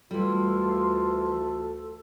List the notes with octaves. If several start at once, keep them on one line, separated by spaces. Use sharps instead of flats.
D2 E3 G3 F4 A4